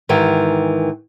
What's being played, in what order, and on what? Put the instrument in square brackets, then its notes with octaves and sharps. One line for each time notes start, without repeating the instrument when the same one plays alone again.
[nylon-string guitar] G#2 D#3 E3 G4